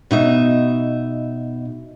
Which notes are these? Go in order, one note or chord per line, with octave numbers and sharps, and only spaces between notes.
B2 D#4 E5